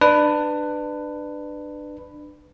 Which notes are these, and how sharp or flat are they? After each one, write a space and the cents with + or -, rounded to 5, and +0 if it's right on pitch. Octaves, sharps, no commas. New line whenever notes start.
D4 +25 B4 +10